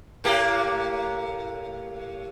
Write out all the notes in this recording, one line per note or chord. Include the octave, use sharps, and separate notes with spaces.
A2 A#3 G4